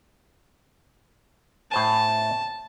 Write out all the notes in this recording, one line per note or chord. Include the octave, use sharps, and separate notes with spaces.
A2 C5 G#5 A5